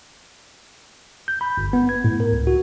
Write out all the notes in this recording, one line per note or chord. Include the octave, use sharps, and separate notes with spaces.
G6
B5
G1
B3
G#6
A2
A#4
C#2
F#4